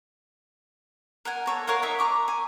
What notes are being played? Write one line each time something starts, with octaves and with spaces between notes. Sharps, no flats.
A#4 F#5 G#5
A4 C#5 A#5
A#4 C#5 F5 F#5
D#4 E5 A#5
A#5 C#6 D6
G#5